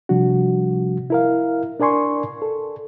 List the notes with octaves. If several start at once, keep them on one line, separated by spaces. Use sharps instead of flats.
C3 F3 G3 D4 F#4
E4 A#4 F5
D4 A#4 D5 G#5 C6 C#6
A4